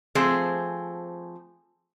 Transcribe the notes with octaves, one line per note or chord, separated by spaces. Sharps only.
F3 A3 C4 G#4